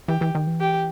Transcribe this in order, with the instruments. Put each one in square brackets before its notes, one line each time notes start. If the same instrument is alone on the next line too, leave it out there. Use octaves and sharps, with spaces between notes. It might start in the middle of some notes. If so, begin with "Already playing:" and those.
[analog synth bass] E3 [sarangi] G4
[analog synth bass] E3
D#3
E3
[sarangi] G4